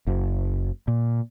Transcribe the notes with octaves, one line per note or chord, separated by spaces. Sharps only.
F#1
A#2